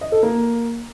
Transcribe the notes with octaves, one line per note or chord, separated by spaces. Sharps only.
D#5
A4
A#3